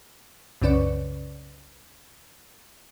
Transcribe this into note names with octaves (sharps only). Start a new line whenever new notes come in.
C2 F#2 C#3 C#4 B4 D5